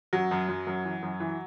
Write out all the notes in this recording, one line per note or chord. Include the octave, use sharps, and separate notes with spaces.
F#2 F#3
F#2
F#2
F#2
E3
F#2
E3